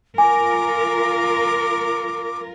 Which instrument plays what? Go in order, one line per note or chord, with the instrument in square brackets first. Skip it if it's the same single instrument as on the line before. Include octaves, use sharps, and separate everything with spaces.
[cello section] F4 A#4 [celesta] G#5 [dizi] D6